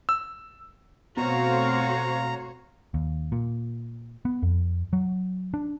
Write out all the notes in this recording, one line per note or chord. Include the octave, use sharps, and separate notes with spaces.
E6
B2 A3 C4 F#4 C5 C#5 F5 A#5
D#2
A#2
B3
F2
F#3
D4